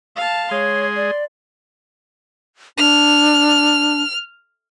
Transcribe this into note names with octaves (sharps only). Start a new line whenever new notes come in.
F5 A5
G#3 G#4 C#5 C6
D5
D4 F6